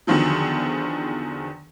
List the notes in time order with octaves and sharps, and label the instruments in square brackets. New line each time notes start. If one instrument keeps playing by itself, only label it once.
[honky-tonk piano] E2 D3 D#3 F3 F#3